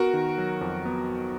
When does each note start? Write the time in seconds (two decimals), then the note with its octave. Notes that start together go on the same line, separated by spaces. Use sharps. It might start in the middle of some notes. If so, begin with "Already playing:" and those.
Already playing: B3 F#4 A#4
0.14 D#3
0.38 F#3
0.61 F2
0.86 B3